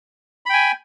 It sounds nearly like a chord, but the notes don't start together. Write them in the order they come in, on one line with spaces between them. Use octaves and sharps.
B5 G5 G#5